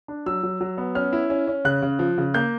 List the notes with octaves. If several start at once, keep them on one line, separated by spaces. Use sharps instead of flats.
D4
F#3 E6
F#3
F#3
B3
C#4 F6
E4
C#4
C#4
C#3 F#6
C#3
F3
C#3
A#3 G6